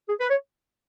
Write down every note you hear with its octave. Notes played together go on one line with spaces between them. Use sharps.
G#4
B4
C#5